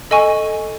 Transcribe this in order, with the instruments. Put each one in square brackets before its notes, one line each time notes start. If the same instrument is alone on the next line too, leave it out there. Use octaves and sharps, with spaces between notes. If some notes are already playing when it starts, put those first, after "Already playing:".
[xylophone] A4 D#5 G#5 C#6